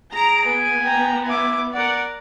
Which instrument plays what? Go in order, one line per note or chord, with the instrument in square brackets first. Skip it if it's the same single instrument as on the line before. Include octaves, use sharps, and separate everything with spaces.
[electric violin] G#4 D7 [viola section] A#5
[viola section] B3 [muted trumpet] G#5
[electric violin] G5 A#5
[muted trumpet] E4 [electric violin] G#5 D6
[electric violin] A#4 D5 [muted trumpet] F#5